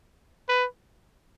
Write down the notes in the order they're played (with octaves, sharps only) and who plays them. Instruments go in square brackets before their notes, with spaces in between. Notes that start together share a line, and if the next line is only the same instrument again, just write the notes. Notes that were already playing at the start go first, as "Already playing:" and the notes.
[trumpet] B4